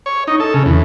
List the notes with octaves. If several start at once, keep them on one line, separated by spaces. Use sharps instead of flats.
C#5
D#4
A4
C#3
E2